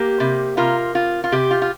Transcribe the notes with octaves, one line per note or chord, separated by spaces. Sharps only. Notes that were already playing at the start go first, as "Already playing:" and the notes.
Already playing: A#3 G4
C3
C3 F4 A#4
F4
F4
C3 G4
F4
F4